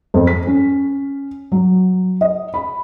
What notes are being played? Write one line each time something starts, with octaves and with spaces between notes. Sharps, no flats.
F2
B6
C#4
F#3
D#5
B5